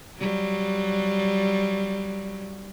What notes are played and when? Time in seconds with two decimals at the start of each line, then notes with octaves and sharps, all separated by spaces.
0.19 F#3 G3